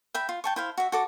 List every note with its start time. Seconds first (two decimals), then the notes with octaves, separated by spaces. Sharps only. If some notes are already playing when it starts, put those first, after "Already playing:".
0.14 E5 G5 B5
0.29 F4
0.44 G5 A5 C#6
0.56 E4 C5 F5
0.77 F#4 E5
0.92 F#4 A4 D6